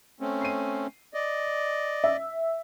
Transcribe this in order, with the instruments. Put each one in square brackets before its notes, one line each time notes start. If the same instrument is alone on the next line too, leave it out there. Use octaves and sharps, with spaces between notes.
[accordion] A3 C4 C#4
[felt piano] C7 D#7
[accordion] D5 D#5
[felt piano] E5